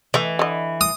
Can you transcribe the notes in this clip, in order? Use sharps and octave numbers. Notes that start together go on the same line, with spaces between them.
E3 A3 D#5
D3 D#5
D#6